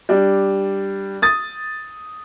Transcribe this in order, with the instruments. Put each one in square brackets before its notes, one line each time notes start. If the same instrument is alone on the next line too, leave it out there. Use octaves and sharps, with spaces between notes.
[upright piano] G3 D4
D#6 A6